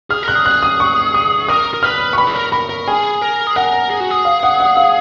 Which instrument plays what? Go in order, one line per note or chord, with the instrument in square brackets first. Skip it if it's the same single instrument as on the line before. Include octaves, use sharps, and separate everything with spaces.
[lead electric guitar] G#4 [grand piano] F6
[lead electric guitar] A#4 [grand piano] F#6
[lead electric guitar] G#4
[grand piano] F#6
D#6
C#6
D#6
[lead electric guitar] A#4 [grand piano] D#6
[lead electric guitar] A#4
[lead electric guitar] B4 [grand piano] F6
[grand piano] C#6
[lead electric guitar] B4 [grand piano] B5
[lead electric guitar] G#4
A#4
[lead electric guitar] A#4 [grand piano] B5
[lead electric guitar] A#4
[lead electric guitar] G#4 [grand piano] G#5
[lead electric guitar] A#4
G#4
[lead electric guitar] A#4 [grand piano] F#5
[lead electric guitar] G#4
F#4
G#4
[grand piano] F5
F#5
F#5
F5